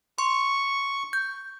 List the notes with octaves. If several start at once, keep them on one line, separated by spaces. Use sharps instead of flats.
C6 C#6
G6